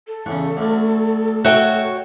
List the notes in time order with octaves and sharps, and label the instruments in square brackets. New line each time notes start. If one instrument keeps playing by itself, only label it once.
[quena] A4
[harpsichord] E2 C#3 [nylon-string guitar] F#5
[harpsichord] D2 F#3
[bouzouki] F#4 C#5 G5 [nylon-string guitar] E5